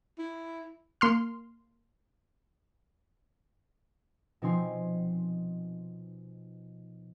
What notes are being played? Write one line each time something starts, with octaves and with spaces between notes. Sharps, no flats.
E4
A#3 C6 F6
B2 F3 C4 D#4 G#5 C6